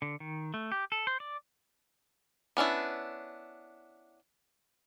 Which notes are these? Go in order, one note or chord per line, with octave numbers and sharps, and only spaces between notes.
D3
D#3
A3
G4
A4
C5
D5
B3 C#4 D4 E4